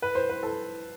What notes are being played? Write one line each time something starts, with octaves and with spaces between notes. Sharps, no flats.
B4
C5
B4
A4